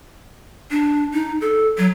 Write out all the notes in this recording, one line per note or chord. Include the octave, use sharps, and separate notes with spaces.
D4
D#4
A4
F#3